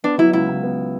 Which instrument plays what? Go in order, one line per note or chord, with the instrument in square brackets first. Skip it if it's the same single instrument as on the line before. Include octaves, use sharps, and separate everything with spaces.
[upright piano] B3 [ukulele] D4
[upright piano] F#3 [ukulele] E4
[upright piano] C#2 [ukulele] E4
[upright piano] C#2
B3